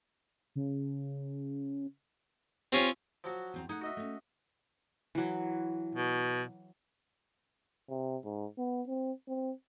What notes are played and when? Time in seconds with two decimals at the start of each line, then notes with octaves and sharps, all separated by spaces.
0.55 C#3
2.72 C4 C#4 F4 G4
3.24 F3 F#3 F#4
3.54 E2 C4 A#5
3.69 A3 D#4 G#4 F#5
3.81 F#4 D#5 E5
3.97 A3 C#4
5.15 E3 F#3
5.95 B2
7.90 C3
8.24 G#2
8.58 B3
8.87 C4
9.28 C4